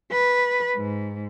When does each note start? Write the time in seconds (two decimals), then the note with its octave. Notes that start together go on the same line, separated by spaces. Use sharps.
0.12 B4
0.77 G#2